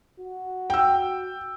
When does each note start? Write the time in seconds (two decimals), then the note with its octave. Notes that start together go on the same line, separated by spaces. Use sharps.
0.20 F#4
0.70 G5 E6